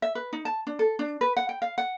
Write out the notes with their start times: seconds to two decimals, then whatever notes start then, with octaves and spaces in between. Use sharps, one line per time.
0.02 E5
0.15 B4
0.33 D#4
0.45 A5
0.67 D4
0.79 A4
0.99 D4
1.21 B4
1.37 F#5
1.49 G5
1.62 F5
1.78 F#5